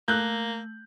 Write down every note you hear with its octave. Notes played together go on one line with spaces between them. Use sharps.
A3 A#3 F#6 G6